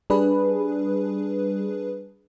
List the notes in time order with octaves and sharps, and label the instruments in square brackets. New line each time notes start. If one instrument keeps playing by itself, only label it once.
[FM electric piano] G3 D4 G#4 B4